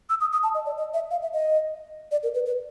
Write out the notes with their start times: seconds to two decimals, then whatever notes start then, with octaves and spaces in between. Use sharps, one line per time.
0.10 E6
0.21 D#6
0.32 D#6
0.43 A5
0.55 D#5
0.66 D5
0.78 D#5
0.94 E5
1.11 F5
1.22 E5
1.33 D#5
2.12 D5
2.23 A#4
2.34 B4
2.46 B4